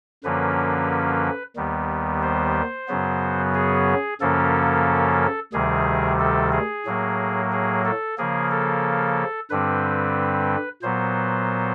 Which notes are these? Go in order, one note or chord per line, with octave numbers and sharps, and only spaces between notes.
F#2 D3 F3 A#3 C#4 B4
D#2 D#3 G3 B3
C5
F#2 C#3 F#3 B3
G#4
F#2 C#3 F3 A#3 C#4 A4
D2 C3 D#3 G3 G#4
A4
G#4
A2 F#3 A#3
G#4
A4
C#3 F3 A#3 G#4
A4
G2 D3 G3 C4 B4
A#2 F#3 B3 C5